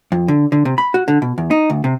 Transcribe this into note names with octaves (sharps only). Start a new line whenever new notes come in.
F2
D3
D3
C3
B5
F#4
D3
B2
E2
D#4
D2
C3